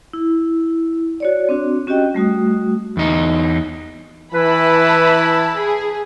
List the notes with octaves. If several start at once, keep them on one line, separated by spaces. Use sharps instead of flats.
E4
F#4 C#5 D5
C4 D4 F#4
C#4 F#4 G4 D#5 G5
G3 A3 F#4 D#6
E2 D#4
E3 E4 B4 A5 B5
G#4